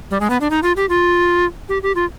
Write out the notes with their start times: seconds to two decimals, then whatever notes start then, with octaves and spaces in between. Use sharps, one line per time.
0.11 G3
0.20 G#3
0.30 B3
0.41 D4
0.50 D#4
0.63 F4
0.76 G4
0.89 F4
1.69 G4
1.83 G4
1.95 F4